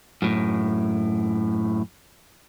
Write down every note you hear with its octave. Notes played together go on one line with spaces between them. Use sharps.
F#2 A2